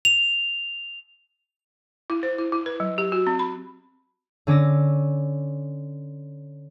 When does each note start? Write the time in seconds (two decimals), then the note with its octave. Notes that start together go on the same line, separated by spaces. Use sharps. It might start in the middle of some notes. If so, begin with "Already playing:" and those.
0.05 F7
2.10 E4
2.23 C5
2.38 E4
2.52 E4
2.66 B4
2.80 F#3
2.98 G4
3.12 F#4
3.27 C4
3.39 B5
4.47 D3 C#4 D6 E6 A#6